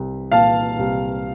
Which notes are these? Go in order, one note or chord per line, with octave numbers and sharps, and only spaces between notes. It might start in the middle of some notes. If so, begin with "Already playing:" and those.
Already playing: C2
A#2 F5 A5
C2